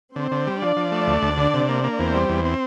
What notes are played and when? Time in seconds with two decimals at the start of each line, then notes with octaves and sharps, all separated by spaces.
0.16 D3 C4 C5
0.31 D3
0.47 G3
0.61 F3 D4 D5
0.76 F3
0.92 A3
1.07 D2
1.22 D2
1.37 D3
1.54 C3
1.69 A#3
1.84 A#3
1.98 E2 C4 C5
2.15 G3
2.29 E2
2.45 C4